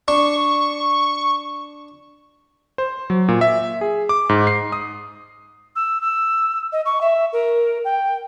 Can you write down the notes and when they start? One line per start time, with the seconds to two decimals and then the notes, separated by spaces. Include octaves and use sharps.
0.08 D4 C#6
2.78 C5
3.10 F#3
3.28 A#2
3.41 E5
3.81 G#4
4.09 D6
4.29 G#2
4.47 C7
4.72 D#6
5.76 E6
6.01 E6
6.72 D#5
6.85 C#6
7.01 E5
7.33 A#4
7.84 G5